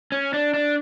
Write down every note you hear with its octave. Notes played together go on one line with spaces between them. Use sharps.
C#4
D4
D4